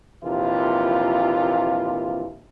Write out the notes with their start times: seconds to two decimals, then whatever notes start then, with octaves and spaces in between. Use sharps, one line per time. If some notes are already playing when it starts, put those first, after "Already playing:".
0.24 A#1 D#2 C3 E3 F4